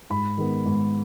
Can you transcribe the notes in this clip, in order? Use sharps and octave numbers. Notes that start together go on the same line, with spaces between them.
G#2 B5
D#3 G#3 B3
G#2